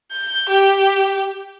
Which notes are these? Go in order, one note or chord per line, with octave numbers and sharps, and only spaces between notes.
G6
G4